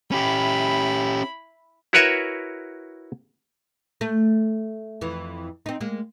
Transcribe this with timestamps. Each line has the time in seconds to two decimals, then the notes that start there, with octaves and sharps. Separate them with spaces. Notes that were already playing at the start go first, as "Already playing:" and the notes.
0.12 C#4 E4 G4 B5
1.93 E4 F#4 A#4 B4 C#5 E5
4.01 A3
5.01 F2 E3
5.66 C4 D#4
5.80 G#3 A#3